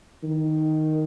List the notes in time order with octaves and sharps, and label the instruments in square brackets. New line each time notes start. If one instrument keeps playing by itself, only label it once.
[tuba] D#3